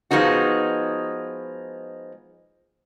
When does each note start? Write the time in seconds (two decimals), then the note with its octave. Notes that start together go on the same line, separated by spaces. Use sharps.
0.11 F3 G#3 B3 D#4 F#4